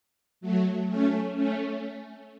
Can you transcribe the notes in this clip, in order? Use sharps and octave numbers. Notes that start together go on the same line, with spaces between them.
F#3 A3
A3 C#4
A3 C#4